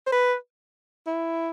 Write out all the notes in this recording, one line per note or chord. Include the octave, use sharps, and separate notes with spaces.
C5
B4
E4